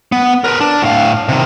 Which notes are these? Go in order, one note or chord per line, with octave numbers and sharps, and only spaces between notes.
B3
A#4 B4
D4
A2 F5
C3 D#3